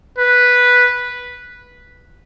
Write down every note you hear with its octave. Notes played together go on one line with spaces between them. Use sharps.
B4